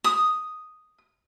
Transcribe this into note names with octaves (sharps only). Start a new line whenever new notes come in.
D#6